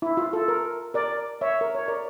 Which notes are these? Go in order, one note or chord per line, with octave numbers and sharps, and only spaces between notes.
E4
F4
A4
A#4
A#4 D5
C#5 E5
A#4
C#5
A#4 D5